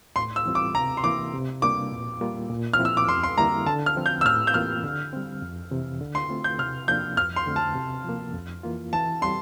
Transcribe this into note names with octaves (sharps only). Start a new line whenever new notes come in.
A2 C6
E6
E3 G3 C4 F4
D6
C3 A#5
C6
E3 A#3 E4 D6
C3
G3 A#3 D4 D6
A#2
G3 A#3 F4
A#2
F6
F3 C4 E4
E6
D6
F2 C6
C6
D3 G3 A#3 E4 A#5
D3 A5
F6
F3 C4
G6
E6
A2 F6
G6
E3 A#3 F4 F6
D3
G3 C4
F2
C3 E3
D3
C6
A3 C4 F4
G6
C3 F6
F3 A#3 D4 G6
F2 F6
C6
D3 A3 C4
A5
C3
F3 A#3
F2
E3 A#3 F4
E3 A5
G3 C4 C6